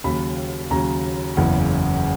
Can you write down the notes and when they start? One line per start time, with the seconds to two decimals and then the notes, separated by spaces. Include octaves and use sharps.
0.04 D#2 C#3 F#3 B5
0.70 D#2 C#3 F#3 A#5
1.37 F#1 E2 C#3 E3